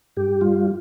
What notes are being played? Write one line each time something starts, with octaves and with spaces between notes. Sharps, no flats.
G2 G4
G3 F4